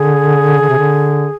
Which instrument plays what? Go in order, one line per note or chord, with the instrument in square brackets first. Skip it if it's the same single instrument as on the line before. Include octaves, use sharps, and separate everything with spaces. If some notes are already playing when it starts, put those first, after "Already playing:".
Already playing: [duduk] D3 [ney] G#4
[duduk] D3
C3
D3